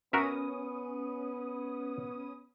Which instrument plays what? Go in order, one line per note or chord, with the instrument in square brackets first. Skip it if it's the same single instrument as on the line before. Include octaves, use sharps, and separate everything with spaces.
[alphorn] B3 [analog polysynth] C#4 D#6 [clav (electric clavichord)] F#4 A#4 E5